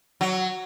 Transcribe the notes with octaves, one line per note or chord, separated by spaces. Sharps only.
F#3